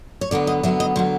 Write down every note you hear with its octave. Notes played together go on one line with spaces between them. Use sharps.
C#5
D3 F#3 B3 D5
D#5
D3 F#3 B3 E5
D#5
D3 F#3 B3 C5